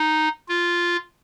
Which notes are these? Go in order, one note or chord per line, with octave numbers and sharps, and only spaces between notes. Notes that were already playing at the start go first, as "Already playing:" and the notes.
Already playing: D#4
F4